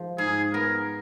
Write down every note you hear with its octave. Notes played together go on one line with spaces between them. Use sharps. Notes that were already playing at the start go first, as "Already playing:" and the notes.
Already playing: F3 G#3
G#2 G#4
B3 A#4